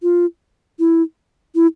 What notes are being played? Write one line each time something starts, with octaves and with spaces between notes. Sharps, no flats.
F4
E4
E4